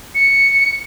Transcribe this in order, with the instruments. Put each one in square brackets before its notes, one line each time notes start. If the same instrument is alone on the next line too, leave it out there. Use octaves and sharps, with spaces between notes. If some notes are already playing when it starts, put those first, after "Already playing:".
[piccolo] C#7